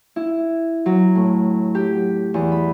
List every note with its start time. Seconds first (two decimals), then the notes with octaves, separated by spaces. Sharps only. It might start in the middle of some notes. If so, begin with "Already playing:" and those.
0.16 E4
0.86 F#3
1.15 A2
1.75 G4
2.34 E2
2.52 B5